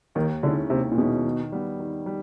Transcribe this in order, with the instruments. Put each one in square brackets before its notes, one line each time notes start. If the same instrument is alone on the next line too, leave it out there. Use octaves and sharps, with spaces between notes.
[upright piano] D#2 [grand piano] D#3
[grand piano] D3 [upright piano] D#3 G#3 C#4 E4
[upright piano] D#2 [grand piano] C3
[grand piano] A#2
[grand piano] B2 [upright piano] D#3 G#3 C#4 E4
[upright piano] D#3
G3 B3
D#3
G3